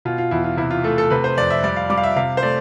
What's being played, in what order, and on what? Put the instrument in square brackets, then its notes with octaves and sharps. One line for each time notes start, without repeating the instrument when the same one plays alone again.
[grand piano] B2 F4
F4
E2 E4
F4
C3 E4
F4
A3 A4
A4
C3 B4
C5
F2 D5
E5
G3 D5
F5
G3 D6
F5
E5
C3 F5
C5
A3 D5